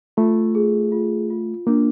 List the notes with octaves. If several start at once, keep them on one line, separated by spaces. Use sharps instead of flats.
A3 F4
G#4
F4
F4
A#3 D4